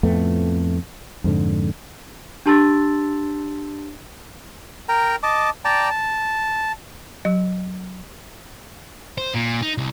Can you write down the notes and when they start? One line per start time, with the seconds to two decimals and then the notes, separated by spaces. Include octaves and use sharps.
0.03 F2 A2 A3 B3
1.24 F2 G#2 D3
2.46 D4 G4 A5 C6 E6 A6
4.89 A#4 G5 A#5
5.23 D#5 A5 D6
5.65 D5 G5 A5 A#5
5.90 A5
7.25 F#3
9.18 C5
9.34 A#2
9.62 D#4
9.78 C2